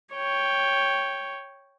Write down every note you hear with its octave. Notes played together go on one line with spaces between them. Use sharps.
C#5 G5